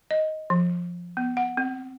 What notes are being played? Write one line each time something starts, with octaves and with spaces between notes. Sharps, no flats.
D#5
F3
B3
F#5
C4